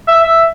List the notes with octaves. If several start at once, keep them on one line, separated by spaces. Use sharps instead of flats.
E5
E5